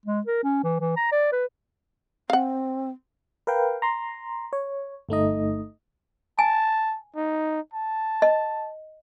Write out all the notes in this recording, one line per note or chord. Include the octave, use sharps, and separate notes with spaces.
G#3
A#4
C#4
E3
E3
A#5
D5
B4
C4 F5 F#5
A#4 B4 F5 G5
A#5 C6
C#5
G1 A3 D#4 D#5
G#5 A5
D#4
A5
D#5